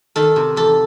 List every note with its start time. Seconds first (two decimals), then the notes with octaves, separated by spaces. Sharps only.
0.16 D#3 A4
0.36 C3
0.56 E2 A4